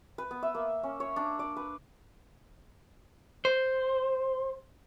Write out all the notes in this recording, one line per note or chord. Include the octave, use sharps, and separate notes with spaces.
B4
B3
E5
A#3
C#4
C#5
D4
D5
B4
C5